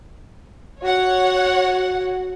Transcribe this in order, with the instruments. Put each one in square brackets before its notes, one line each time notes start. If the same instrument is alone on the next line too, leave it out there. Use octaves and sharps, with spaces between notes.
[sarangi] F#4 [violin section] C#5 F#5